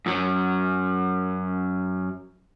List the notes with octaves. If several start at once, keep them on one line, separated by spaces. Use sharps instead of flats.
F#2 F#3